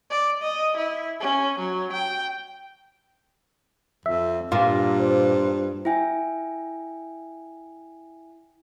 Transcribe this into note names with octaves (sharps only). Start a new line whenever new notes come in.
D5
D#5
E4
C#4
F#3
G5
F2 E5
G2 A#2 F4
C5
E4 E5 G5 G#5